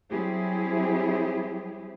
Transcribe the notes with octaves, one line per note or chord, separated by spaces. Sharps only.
F#3 G3 C4 E4 G4 G#4